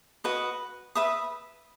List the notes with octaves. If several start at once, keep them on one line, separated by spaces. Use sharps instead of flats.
F#4 B4 D#5
B4 E5 B5 D#6